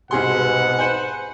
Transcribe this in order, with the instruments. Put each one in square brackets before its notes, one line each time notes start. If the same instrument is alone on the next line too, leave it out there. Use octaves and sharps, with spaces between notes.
[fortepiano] C2 G#4 C6 [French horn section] G#2 B2 [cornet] F#5
[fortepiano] B4 C5 G#5